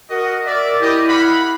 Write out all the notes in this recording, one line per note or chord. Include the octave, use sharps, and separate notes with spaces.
F#4 A#4 D#5
D5 E5
E4 G4 D#5
F5 F#5 B5